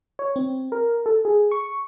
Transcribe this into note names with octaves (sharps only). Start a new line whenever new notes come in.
C#5
C4
A#4
A4
G#4
C#6